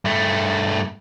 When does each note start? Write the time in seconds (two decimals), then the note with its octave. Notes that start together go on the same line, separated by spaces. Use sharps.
0.05 G2 A3